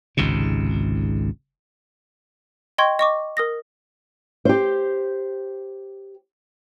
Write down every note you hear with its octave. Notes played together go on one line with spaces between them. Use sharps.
G#1 C#2 G#2 C3
D#5 G5 C6 C#6 G#6
D#5 C#6 D6
A#4 D#6 A#6
G4 C5